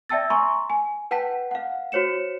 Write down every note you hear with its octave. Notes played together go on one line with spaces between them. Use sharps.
D5 E5 G5 A5 E6 A6
G#5 A#5 C6 C#6
G#5
B4 F#5 G5 A5 B6
F5 F#5
F#4 C5 C#5 C#7 E7